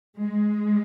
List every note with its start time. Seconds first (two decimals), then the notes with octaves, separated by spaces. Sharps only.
0.19 G#3